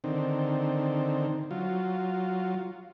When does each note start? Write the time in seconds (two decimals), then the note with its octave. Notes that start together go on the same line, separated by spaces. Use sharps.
0.04 D3 D#3 C4
1.51 F#3 F4